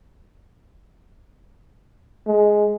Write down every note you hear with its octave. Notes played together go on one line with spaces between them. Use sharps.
G#3